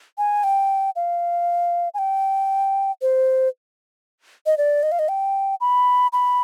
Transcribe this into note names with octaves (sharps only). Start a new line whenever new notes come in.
G#5
G5
F5
G#5
G5
C5
D#5
D5
D#5
F5
D#5
G5
B5
B5